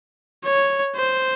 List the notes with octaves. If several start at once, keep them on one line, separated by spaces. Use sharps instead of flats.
C#5
C5